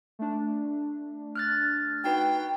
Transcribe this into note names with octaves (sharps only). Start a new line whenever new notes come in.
A3 D4
F6 F#6 A6
D#4 F#4 B4 G5